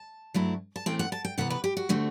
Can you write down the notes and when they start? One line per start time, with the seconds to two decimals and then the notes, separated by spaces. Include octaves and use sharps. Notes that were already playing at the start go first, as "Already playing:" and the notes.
Already playing: A5
0.34 G2 F#3 A3 C4 E4
0.76 A5
0.86 A2 E3 A3 C4 G5
0.99 F#5
1.12 A5
1.25 G5
1.38 C3 E3 B3 F#5
1.50 B4
1.64 G4
1.77 F#4
1.89 D3 A3 C4